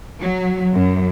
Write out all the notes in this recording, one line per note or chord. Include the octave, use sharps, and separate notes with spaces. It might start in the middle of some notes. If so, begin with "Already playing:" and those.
F#3
F#2